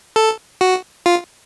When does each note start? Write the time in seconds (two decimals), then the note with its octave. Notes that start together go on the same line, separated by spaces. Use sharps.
0.16 A4
0.61 F#4
1.06 F4